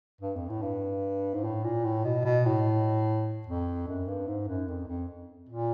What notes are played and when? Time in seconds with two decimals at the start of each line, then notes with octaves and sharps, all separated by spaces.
0.21 G2
0.36 F2
0.49 A2
0.62 G2
1.34 G#2
1.44 A2
1.64 A#2
1.84 A2
2.05 B2
2.25 B2
2.46 A2
3.47 F2
3.88 F#2
4.08 G2
4.28 G#2
4.48 F#2
4.68 F2
4.88 F2
5.49 A#2